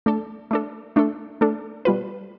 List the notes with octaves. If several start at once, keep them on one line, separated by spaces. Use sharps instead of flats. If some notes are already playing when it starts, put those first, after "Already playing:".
A3 D4 A4
A3 D4 A4
A3 D4 A4
A3 D4 A4
B2 G3 B3 F4 B4